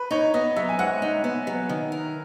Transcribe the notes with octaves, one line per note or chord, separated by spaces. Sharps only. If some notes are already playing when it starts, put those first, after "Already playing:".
Already playing: B4
D#4 C#5
B3 D#5
F#3 E5
G#5
G#2 F#5
D#4
B3
F#3
D#3
A#4